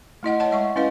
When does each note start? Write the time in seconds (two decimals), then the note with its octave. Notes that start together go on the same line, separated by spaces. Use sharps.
0.23 A3 E4 D#5 F#5
0.40 C#5 D#5 F#5 A5 C6
0.52 G#3 D#5 E5 F#5 C#6
0.76 C#4 E4 B4 D#5 F5